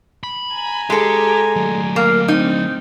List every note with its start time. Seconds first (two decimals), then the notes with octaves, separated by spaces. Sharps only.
0.23 B5
0.54 G#5 A#5
0.90 G#3 G4 A4
1.56 F#3 A3
1.96 A#3
2.28 C4 D#4